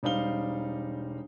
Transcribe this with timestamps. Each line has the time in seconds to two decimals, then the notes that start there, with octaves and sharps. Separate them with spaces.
0.03 E1 G3 D#4 C5 F5 G7